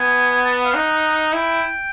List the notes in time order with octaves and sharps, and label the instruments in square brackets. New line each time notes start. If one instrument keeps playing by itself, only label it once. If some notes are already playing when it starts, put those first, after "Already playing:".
Already playing: [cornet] B3 [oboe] G#5
[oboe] A5
F5
[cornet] D#4 [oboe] F#5
[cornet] E4 [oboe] G5